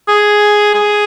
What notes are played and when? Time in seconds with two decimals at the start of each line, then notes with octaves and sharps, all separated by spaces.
0.08 G#4
0.74 G#4